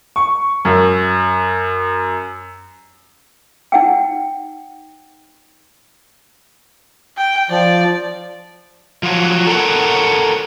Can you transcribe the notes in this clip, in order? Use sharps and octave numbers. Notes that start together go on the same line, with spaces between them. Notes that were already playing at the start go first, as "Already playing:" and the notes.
C#6
F#2
D#4 F#5 G5
G5
F3 D5
F3 F#3
A4 A#4 C#5 F#5